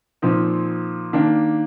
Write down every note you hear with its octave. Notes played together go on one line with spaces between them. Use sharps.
A#2 F3 C4 D#4
D#3 A#3 D4